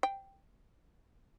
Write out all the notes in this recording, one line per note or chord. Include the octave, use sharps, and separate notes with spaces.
G5